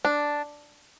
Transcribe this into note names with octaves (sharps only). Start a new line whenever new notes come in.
D4